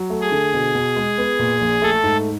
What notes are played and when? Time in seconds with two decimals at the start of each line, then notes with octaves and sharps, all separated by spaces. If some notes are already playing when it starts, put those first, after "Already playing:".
Already playing: F#3
0.10 A3
0.21 G#4
0.32 D3
0.54 B2
0.75 B2
0.96 G#3
1.18 B3
1.39 A#2
1.61 A#1
1.82 A3 A4
2.03 G#2